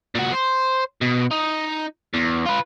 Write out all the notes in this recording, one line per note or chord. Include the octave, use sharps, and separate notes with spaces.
A#2 F#4
C5
B2
D#4
E2
F4 B4